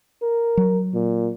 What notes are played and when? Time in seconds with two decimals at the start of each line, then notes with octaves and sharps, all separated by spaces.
0.22 A#4
0.57 F#3
0.94 A#2